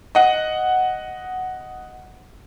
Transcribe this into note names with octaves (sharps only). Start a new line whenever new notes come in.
D#5 F#5